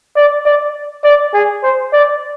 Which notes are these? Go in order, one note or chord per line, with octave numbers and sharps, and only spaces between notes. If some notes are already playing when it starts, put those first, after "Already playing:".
D5
D5
D5
G#4
C5
D5